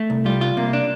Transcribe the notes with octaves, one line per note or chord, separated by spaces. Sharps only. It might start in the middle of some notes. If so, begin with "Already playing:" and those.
Already playing: A3
C2
G3 F4
F4
C3 A#3
D4